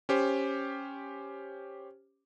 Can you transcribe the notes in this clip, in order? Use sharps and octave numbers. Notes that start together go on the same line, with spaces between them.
C#4 G4 C5